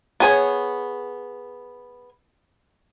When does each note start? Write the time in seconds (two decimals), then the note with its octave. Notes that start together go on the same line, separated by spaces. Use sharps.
0.20 B3 G#4 C#5